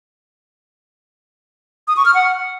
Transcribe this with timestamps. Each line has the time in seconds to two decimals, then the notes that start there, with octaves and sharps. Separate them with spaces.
1.88 D#6
1.97 C#6
2.06 F6
2.14 F#5